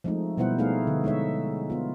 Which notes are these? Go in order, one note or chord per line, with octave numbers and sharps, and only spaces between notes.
F3 G#3 A3 C4 D#4
B2 G3 B3 E4 C5 F#5
A3 B3 D#4 G#4 F5
D3
G#3 D#4 C#5 E5
B3 F4